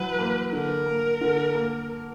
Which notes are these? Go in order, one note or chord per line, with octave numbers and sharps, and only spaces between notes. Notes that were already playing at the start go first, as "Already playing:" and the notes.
Already playing: E3 F#3 B4
A#3
D3 A#4
A#3
D3
A#3